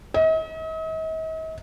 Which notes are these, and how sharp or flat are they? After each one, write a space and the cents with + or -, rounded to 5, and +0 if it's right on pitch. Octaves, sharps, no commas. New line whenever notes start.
D#5 +45